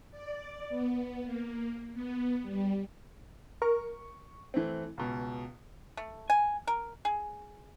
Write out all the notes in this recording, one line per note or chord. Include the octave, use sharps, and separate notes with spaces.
D5
B3
A#3
B3
G3
A#4 C#6
E3 A3 C4
C#2 B2
A3
G#5
A#4
G#4